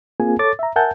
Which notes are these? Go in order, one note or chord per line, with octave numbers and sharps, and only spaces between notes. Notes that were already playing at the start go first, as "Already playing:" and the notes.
A#3 C4 F4 G#4 G#5
A4 C#5 D6 A6
E5 A#5
A#4 E5 F#5 G#5 A5 G6